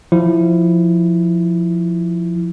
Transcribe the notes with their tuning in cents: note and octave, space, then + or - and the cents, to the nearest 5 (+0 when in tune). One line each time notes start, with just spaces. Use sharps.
F3 +0 E4 +0